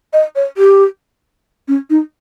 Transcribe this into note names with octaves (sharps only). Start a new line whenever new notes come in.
D#5
C#5
G4
C#4
D#4